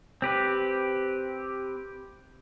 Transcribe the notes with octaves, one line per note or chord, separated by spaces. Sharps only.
C4 G4 B4